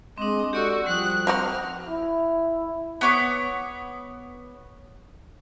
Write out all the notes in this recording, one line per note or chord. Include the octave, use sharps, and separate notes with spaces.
G#3 C4 D4 D#5
F#4 G4 A4 D5 E6
F3 G3 D#6 F#6
F#3 C4 F#4 F6
E4
B3 C#5 D6